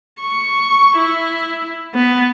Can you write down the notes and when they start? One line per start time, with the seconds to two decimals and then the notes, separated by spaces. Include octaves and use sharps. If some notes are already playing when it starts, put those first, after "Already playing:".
0.21 C#6
0.97 E4
1.95 B3